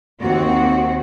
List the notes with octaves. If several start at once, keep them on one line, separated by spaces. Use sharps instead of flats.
D#2 C4 F#4